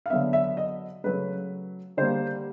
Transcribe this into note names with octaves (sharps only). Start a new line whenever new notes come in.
F5
D3 F#3 B3 E5
E5
D#5
C#3 F#3 A3 B4
D3 G3 A#3 C5